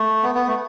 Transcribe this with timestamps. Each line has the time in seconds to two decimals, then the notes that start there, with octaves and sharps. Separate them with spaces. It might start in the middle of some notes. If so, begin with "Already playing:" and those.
Already playing: A3
0.23 B3
0.35 B3
0.47 A3